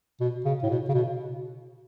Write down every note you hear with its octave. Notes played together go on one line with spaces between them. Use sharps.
B2
C#3
A2
B2
C#3
B2